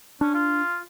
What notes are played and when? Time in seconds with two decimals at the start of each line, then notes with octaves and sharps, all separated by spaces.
0.21 C#4 D4
0.34 F4